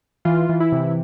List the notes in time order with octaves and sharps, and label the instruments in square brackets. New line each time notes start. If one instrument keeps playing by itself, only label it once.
[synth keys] E3 F4
E3
E4
C3